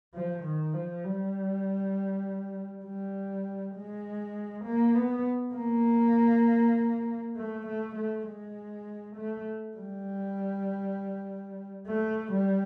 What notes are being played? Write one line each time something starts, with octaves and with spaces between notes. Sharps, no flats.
F3
D#3
F3
G3
G3
G#3
A#3
B3
A#3
A3
A3
A3
G#3
A3
G3
A3
G3